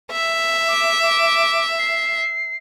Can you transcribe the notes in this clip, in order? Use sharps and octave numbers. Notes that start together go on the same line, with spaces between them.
E5
D6
D6
C7